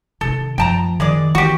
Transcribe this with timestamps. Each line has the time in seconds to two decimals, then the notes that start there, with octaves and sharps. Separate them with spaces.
0.21 C3 D#3 A4
0.58 F#2 F3 A3 G5 A5 A#5
1.00 D#3 G#3 G#4 D5
1.35 E3 A#3 F#4 G4